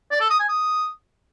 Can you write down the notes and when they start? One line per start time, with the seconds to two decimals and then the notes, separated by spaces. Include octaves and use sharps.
0.11 D5
0.21 A4
0.30 D#6
0.39 G#5
0.49 D#6